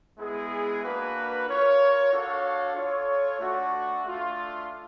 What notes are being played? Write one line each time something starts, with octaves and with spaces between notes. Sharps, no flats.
G#3 B3 E4 G#4
A#3 D4 F#4 B4
F4 A#4 C#5
D4 F#4 A4 C#5 F5
F4 A4 C#5
A3 D4 F#4
A3 D4 F4